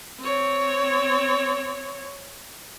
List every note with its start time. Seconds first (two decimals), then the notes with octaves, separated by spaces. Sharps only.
0.20 C4 C#5